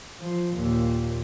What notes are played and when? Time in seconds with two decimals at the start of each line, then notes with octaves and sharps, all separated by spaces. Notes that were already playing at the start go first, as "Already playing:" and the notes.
0.20 F3
0.55 D#2 A#2